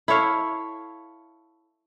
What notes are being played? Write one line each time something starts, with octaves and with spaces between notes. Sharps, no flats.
E4 A4 C#5 F5